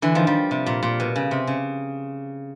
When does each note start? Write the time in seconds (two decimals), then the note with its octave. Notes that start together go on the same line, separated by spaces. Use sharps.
0.02 D3 E3
0.15 D#3 F3
0.27 F3 G3
0.51 C3
0.66 A#2
0.83 A#2
1.00 B2
1.16 C#3
1.31 C3
1.47 C#3